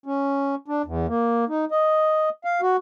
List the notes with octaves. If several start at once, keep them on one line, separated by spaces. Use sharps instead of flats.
C#4
D4
E2
A#3
D#4
D#5
F5
F#4